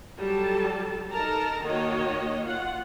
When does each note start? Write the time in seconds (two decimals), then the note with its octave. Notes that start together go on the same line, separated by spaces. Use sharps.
0.18 F#3 G3 A4 A5
1.11 D#4 A4 A#4 A5 A#5
1.64 D#3 A#3 F#4 C#5 D#5
2.43 F4 F#5